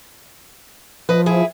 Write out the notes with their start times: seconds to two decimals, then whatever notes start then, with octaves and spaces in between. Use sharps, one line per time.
1.09 F3 B4 D#5
1.26 E4 G#4